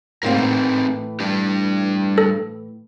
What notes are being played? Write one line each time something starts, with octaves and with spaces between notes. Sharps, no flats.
G#2 C3 A#3 C4 D#4 A#4
A2 E3
G3 D4 G4
A4